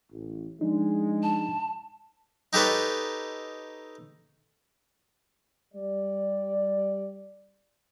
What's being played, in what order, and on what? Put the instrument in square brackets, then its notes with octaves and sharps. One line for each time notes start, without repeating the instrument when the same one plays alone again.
[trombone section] A1
[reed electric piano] F3 D4 D#4 [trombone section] G#3
[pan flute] A5
[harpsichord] D#4 G4 A4 B4 C#5
[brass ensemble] G3 D5